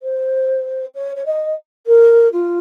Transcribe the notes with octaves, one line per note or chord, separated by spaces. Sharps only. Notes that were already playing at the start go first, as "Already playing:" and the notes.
C5
C#5
C#5
D#5
A#4
F4